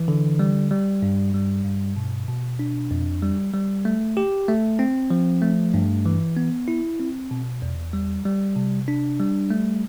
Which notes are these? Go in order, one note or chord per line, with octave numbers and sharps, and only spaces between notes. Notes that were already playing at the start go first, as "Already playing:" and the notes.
Already playing: E3
D3
G3
G3
G2
G3
G2
B2
B2
D4
F2
G3
G3
A3
G4
A3
C4
F3
A3
G2
E3
B3
E4
C4
B2
E2
G3
G3
C3
D4
G3
A3